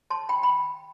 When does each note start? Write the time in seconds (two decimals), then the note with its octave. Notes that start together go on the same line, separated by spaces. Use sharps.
0.10 A5 C6
0.29 G5 B5
0.43 G5 B5